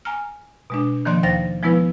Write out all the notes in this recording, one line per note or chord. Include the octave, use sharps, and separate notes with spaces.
G#5 A#5 F6
B2 G#3 D4
D#3 F3 A#3 D5 C6 F#6
D#2 C5 F5 A6 A#6
F3 G#3 B3 E4 B4